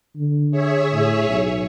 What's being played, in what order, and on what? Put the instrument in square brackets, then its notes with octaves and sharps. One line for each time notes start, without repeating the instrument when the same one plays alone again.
[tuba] D3
[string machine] G#4 C#5 E5
[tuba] A2
B1